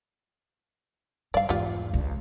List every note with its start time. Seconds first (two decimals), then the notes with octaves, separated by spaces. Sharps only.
1.34 G2 D5 F5
1.49 E2 G#2 G3 F4
1.93 C#2 C#3